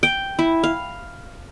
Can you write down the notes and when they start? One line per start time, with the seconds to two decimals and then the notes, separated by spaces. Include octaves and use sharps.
0.03 G5
0.39 E4
0.63 F5